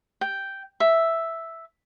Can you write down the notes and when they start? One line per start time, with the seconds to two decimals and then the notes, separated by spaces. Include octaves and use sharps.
0.21 G5
0.80 E5